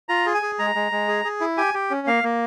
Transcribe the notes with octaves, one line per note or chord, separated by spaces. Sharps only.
F4 A#5
G#4
G#5
G#4
G#3 A#5
G#3
G#3
G#4
G#4
E4
G4 G#5
G4
C#4
A#3 F5
A#3